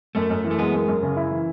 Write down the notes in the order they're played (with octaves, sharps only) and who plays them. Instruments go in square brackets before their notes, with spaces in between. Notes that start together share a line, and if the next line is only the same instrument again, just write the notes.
[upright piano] F#2 [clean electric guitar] A3
[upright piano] F#2
E3
[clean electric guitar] A3
[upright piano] G#3 [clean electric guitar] B3
[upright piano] F#2
F#2
C#3
E4
E3